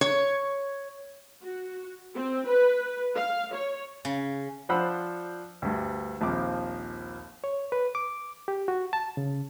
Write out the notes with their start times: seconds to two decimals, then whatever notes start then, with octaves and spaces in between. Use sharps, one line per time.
0.01 C#5
1.41 F#4
2.14 C4
2.47 B4
3.16 F5
3.53 C#5
4.05 C#3
4.69 F3 D4 C5 F#5 B5 E6
5.62 D2 G2
6.21 A#1 D#2 F3 C4 D6
7.44 C#5
7.72 B4
7.95 D6
8.48 G4
8.68 F#4
8.93 A5
9.17 C#3